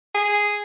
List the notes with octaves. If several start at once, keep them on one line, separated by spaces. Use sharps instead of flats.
G#4